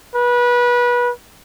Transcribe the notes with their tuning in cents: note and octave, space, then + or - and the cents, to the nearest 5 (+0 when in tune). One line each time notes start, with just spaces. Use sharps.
B4 -25